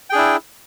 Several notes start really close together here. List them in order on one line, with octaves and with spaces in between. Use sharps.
G5 G#4 D4 E4